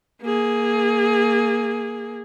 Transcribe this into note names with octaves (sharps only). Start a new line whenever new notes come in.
A#3 G#4